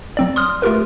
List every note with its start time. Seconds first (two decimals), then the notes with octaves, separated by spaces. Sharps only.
0.17 F#3 C4 D5
0.36 C6 D#6 F6
0.62 A3 F4 G4 A#4 B4